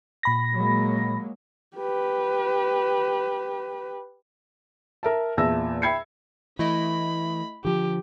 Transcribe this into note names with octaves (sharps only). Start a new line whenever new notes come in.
A#2 B5 A#6
F#3 G#3 A#3
G4 B4
A#4 E5 A5
E2 A#2 E5 A5 E6 A#6
E5 G5 B5 G#6 C7 C#7
E3 A3 E4 D#5 B5
D3 F3 G4